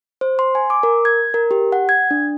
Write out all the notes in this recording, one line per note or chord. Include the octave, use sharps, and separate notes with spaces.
C5
C6
G#5
D6
A#4
G#6
A#4
G4
F#5
G#6
D4